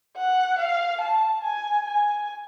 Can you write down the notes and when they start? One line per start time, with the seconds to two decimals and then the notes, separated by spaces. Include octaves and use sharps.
0.17 F#5
0.59 F5
1.01 A5
1.44 G#5
1.86 G#5